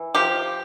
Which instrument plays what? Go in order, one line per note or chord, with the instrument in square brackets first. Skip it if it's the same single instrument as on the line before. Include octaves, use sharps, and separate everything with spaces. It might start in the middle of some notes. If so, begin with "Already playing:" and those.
Already playing: [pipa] E3
F3 G4